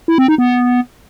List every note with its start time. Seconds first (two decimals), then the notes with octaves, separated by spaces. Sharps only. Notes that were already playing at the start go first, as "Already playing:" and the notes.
0.08 E4
0.18 C4
0.28 D#4
0.38 B3